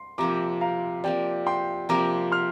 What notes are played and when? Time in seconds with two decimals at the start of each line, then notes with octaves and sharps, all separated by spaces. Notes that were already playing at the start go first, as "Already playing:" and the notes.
Already playing: C6
0.18 C3 F3 A#3 A#5 D6
0.61 F5 A#5
1.04 C3 F3 A#3 D5 G5
1.46 G5 C6
1.89 C3 F3 A#3 A#5 D6
2.32 C6 F6